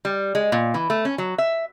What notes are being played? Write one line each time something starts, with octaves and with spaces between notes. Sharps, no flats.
G3
G#3
A#2
E3
A3
C#4
F#3
E5